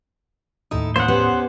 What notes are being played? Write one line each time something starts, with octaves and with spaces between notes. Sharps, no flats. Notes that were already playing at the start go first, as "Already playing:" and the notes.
D#2 A2 D#4 E4 A4 D#6
A#3 C#4 E4 C5 F#5
B3 C#4 G4